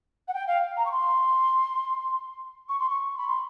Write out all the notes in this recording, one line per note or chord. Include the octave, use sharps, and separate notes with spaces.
F#5
G5
F5
A#5
C#6
C6
C#6
C6
C#6
B5
C6